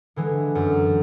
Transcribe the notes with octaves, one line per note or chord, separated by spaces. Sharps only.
D3 E3 G#3
F#2